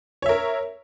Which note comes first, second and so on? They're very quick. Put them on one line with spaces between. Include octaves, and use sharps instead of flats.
C#5 E5 A#4